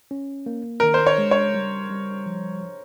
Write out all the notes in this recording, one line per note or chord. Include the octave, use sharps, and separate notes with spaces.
C#4
A#3
D#3 A#4
C5
C#5
G#3
C#5
G3
G3
F3